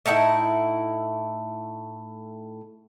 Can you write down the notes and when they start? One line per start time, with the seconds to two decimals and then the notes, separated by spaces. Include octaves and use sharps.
0.06 A2 D#4 E4 F#5